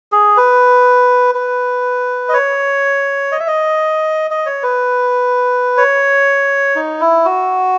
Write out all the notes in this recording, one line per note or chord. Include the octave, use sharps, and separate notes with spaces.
G#4
B4
B4
D#5
C#5
D#5
E5
D#5
D#5
C#5
B4
C#5
D#4
E4
F#4